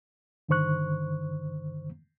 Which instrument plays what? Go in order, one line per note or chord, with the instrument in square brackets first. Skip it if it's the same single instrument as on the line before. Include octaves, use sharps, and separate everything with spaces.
[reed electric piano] G2 D3 D#3 C5 C#6 F#6